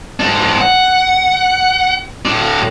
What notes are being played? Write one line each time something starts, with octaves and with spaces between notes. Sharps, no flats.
G#2 D4
F#5
A2 D4